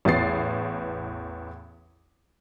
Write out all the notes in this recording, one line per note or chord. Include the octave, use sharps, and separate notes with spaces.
A1 E2 B3 A6 C7